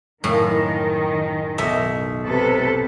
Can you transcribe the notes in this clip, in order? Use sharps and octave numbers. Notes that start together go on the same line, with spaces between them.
F#1 A2 D#3
B1 E5
C3 A4 B4